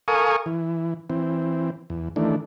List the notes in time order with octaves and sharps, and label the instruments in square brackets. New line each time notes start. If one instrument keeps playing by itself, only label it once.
[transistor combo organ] A4 A#4 F5 G#5 C#6 D#6
E3
E3 C4
E2
D#3 E3 A3 D4